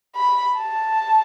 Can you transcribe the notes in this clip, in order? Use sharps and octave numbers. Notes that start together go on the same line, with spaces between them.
B5
A5